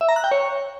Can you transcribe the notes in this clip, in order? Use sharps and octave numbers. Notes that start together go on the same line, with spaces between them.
E5
A#5
F#6
G5
C#5